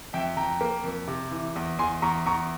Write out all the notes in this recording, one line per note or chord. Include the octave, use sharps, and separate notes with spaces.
F2 E5 G5
F2 G5 A#5
A#3
F2
C3
E3
E2
E2 G#5 C6
E2 A#5 C#6
E2 A#5 C#6